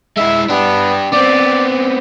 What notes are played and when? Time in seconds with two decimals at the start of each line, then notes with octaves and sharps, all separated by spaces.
0.17 G#3 E4 E5
0.49 B3 D4 G4
1.13 B3 C4 D5